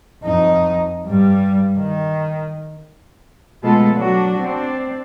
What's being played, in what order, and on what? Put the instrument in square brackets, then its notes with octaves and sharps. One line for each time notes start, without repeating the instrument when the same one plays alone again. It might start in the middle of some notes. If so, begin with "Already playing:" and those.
[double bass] F2 D#4
G2 G3
D#3
[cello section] B2 G#3 A3 B3 F4 A4
F#3 D4 F#4
C4 D4